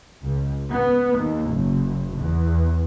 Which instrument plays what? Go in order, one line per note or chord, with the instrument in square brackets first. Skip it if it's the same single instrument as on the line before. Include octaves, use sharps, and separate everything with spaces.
[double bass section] C#2
B3
D#2
F#1
E2